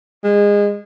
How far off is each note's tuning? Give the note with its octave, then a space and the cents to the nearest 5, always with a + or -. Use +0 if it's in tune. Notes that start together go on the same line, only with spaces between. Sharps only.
G#3 -25